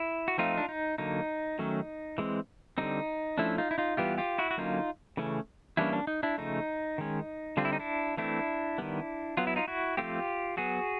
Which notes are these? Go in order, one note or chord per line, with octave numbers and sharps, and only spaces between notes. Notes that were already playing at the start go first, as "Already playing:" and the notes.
Already playing: E4
F#4
F3 A3 C4 D#4 F4
D4
D#4
D3 F#3 A#3 D#4
D#3 F#3 A3 C#4
E3 G#3 C4
D3 G3 C4 D#4
F3 A3 C#4 D4 E4
D#4 F4
E4
D#4 F4
E3 G3 B3 F4 G4
F4 G4
E4 F#4
F#4
D3 F#3 A#3 C#4 D#4 F4
C#3 E3 A3 C#4
E3 G3 A#3 C#4 D4 E4
D4
D#4
D4 E4
C#3 F3 A3 D#4
D#3 G#3 C#4
D3 G3 C4 F4
E4
D#4
D4 E4
E3 A3 C4 D4 E4
D#3 G3 B3
F#3 B3 F4
E4
D#4 F4
E4 F#4
F3 A3 C4 F4 G4
F#3 B3 F#4 G#4